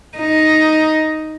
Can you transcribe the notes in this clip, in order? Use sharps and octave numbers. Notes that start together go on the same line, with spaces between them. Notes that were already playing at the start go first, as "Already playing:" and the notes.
D#4